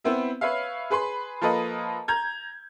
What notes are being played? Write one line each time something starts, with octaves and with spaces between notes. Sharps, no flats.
B3 C4 E4 E5
B4 C#5 E5 F5
G#4 B4 B5 C6
F3 A#3 A4 B4 D#5
A#5 G6 G#6